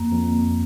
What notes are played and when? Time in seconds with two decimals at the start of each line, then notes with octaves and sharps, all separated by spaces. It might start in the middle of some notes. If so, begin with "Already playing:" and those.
Already playing: F2 A#3
0.12 F2